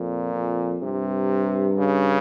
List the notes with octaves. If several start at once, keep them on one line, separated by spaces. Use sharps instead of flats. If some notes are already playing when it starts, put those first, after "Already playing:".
Already playing: F2 A#2
F2
G2 C3
C#3